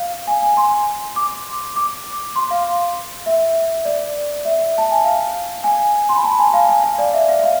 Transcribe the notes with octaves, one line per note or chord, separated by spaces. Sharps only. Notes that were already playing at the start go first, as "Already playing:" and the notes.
Already playing: F5
G#5
G#5
C6
D6
D6
C6
F5
E5
D5
E5
A5
G#5
F5
G#5
C6
B5
A5
G#5
F5
G#5
F5
D5
E5
F5
F5